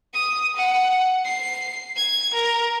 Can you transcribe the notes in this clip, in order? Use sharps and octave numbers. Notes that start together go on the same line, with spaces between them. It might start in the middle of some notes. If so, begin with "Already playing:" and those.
D#6
F#5
C7
G#6
A#4